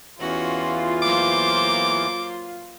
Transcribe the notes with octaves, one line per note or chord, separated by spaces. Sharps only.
E2 E3 C#4 F4 F#4
F#3 A#3 C5 D6